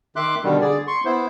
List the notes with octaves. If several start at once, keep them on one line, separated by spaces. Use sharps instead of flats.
D#3 E5 C6 D6 F#6
B2 D3 D#3 G3
D3 G#4 D5
C6 C#6
B3 E4 C5